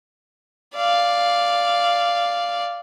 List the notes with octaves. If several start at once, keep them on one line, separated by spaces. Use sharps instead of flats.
D5 F5